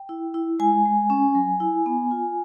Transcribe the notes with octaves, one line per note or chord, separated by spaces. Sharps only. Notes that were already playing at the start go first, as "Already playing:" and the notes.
Already playing: G5
E4
E4
G#3 G#5
G#3
C#4
F#3
E4
B3
F4